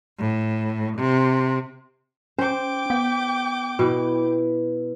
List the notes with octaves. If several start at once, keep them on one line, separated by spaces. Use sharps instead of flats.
A2
C3
C#4 C5 G5 D6
B3 B6
B2 E4 B4